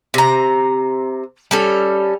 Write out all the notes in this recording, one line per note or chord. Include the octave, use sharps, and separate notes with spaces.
C3 A#5
G3 C#4 A4